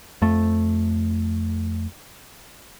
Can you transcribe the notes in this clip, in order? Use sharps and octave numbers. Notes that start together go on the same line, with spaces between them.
F2 A3